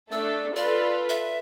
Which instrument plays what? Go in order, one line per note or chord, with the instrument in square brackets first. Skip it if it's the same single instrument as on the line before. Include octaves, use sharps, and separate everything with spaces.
[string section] A3 D4 A4 [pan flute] E6
[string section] F4 A4 B4 [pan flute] D5
[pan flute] E5